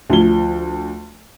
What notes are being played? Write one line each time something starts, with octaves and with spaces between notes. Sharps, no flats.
D2 F3 G7